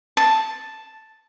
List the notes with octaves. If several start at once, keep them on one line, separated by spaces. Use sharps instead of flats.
A5